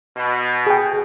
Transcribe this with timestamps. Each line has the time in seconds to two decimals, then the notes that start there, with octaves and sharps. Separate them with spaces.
0.17 B2
0.67 G#4 G5